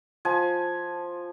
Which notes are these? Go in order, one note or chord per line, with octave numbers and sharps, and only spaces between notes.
F3 G#5